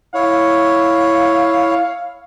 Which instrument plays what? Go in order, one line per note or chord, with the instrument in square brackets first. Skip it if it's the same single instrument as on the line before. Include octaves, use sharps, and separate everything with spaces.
[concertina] E4 C#5 [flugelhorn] F5